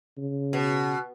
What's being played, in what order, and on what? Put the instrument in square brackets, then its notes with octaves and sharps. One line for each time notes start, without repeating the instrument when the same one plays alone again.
[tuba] C#3
[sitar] B2